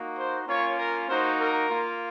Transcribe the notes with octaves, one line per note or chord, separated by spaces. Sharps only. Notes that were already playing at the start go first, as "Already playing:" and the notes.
Already playing: A#3 D#4 F#4
C5
A#3 C#4 F4 C#5
A#4
A#3 D#4 F#4 C5
A#4
A#3 F4